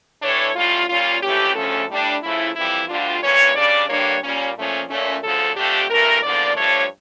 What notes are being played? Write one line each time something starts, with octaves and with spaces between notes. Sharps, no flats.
A2 E3 A3 D4 C#5
A2 G3 C#4 F4
A#2 G3 C#4 F4
F2 E3 A3 C#4 G4
D2 C#3 F3 A3 C#4 A4
A2 G3 D4
C#3 F3 A3 E4
F2 E3 G3 E4
D2 D3 G3 D4 F4
G2 E3 A#3 C#4 C#5
C#3 G3 D4 D5
G2 D3 G3 A#3 D4 C#5
A#2 G3 A#3 C#4
A#2 F3 A3 C#4
A#2 A3 C#4
D2 C#3 F3 A4
F2 D3 A3 D4 G4
G2 E3 A3 A#4
E2 D3 F3 A#3 D5
G2 F3 A3 D4 C#5